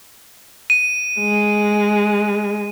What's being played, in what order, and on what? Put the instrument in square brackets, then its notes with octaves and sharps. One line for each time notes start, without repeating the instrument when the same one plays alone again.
[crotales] D#7
[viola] G#3